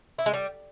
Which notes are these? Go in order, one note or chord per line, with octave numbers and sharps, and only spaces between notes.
E4
G#3
G3